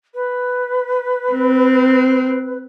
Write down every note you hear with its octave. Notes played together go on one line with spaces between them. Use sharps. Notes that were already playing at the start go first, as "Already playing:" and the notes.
B4
C4